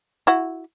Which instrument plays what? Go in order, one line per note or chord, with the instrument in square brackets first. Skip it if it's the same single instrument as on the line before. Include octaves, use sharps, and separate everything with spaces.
[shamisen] E4 F#4